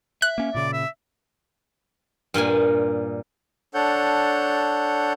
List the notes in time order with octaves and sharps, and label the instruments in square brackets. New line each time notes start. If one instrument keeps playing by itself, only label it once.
[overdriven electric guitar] E5 [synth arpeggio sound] F#6
[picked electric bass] A#3 C#4
[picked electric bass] A#2 C#3 [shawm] D5
[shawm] E5
[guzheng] G2 A#2 A#3 G#5
[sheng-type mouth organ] D4 A4 C#5 F#5 G6